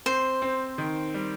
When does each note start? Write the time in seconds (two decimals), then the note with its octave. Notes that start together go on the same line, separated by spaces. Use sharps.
0.06 C4 C5
0.42 C4
0.78 D#3
1.14 G3